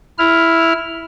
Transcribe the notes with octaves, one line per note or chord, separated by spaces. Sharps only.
E4 F6